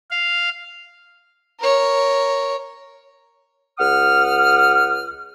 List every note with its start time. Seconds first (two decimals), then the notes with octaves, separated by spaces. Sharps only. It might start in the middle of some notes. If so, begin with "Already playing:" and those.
0.11 F5
1.60 A#4 C#5
3.79 C#2 F#5 D#6 F6